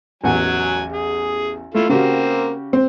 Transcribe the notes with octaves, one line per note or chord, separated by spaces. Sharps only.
A1 E2 F#3 F#5 G#5
G#4
A3 E4 F4 A4
C#3 A#3 C4 F#4 G4
C4